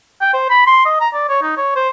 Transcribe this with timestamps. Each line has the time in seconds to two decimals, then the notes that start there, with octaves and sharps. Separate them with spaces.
0.21 G5
0.34 C5
0.50 B5
0.67 C6
0.86 D#5
1.00 A#5
1.14 D5
1.29 C#5
1.42 D#4
1.57 C#5
1.76 C5